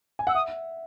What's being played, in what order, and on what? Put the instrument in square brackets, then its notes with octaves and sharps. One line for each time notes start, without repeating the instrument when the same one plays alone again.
[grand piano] G#5
[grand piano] F#5 [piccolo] E6
[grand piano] E5 [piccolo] D#6